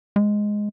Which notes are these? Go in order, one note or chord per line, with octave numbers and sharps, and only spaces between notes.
G#3